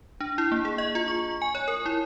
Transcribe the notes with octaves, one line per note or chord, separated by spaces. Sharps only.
D4
E4
A#3
G#4
D#5
F4
C#6
G#5
C#5
A#4
E4